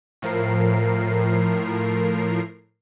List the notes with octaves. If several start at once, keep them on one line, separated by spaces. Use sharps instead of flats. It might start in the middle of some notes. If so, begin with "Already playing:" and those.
A2 F3 A#4 C7